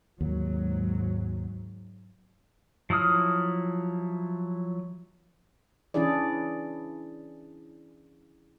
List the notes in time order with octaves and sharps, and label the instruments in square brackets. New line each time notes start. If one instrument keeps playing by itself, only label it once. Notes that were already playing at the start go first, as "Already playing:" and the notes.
[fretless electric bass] D#2 [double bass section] G#2 F#3
[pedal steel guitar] F3 F#3 E4 D#6 F6
[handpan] E3 C#4 D4 E4 G#4 D5